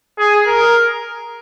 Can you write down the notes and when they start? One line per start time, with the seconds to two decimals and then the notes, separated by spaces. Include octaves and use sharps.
0.19 G#4
0.47 A#4